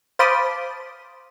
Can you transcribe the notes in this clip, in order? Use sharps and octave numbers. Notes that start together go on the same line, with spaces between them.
C5 F5 A5 B5 D6 D#6